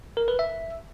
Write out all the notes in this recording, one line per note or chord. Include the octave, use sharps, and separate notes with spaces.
A#4
B4
E5